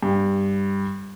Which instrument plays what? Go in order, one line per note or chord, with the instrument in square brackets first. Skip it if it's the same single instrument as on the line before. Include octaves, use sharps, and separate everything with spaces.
[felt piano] G2